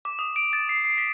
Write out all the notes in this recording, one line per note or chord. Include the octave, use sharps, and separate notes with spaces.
D6
D#6
D7
A6
C7
C7
B6